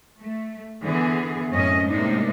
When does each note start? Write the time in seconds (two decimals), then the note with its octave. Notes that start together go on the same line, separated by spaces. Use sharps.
0.21 A3
0.84 D3 E3 B3 G#4
1.52 F#2 A2 A3 C4 C#4 D#5
1.87 A2 C3 G#3 A#3 D4 D#4